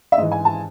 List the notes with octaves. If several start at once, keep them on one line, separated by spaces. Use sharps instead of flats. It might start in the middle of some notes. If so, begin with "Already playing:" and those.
E5
G#2 E3 D#5
G#5
A5